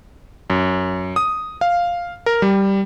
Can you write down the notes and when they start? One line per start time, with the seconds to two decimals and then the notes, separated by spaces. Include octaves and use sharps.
0.50 F#2
1.16 D#6
1.61 F5
2.26 A#4
2.42 G3